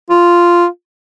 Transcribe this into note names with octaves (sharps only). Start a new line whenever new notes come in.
F4